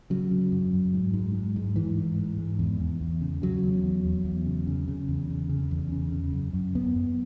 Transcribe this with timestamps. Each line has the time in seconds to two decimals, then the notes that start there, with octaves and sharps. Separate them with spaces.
0.10 C#3 F#3
0.31 C#3
0.52 F#2
0.73 F#2
0.93 G#2
1.14 G#2
1.35 G#2
1.56 G#2
1.76 G#2 E3
1.98 G#2
2.19 G#2
2.38 G#2
2.59 E2
2.80 E2
3.01 E2
3.21 C#3
3.42 C#3 F#3
3.63 E2
3.84 E2
4.05 E2
4.25 E2
4.46 C#3
4.67 C#3
4.88 C#3
5.08 E2
5.30 C#3
5.50 C#3
5.71 E2
5.92 C#3
6.13 C#3
6.33 F#2
6.53 F#2
6.75 F#2 B3
6.96 F#2